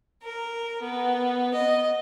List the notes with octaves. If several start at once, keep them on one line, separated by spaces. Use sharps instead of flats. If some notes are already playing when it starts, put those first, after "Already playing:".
A#4
B3
D#5